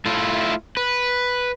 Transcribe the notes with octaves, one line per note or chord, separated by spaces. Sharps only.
A3 E4 F4
B4